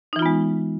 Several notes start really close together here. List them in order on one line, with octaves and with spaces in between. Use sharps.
D#4 E3 F4 B3 G#3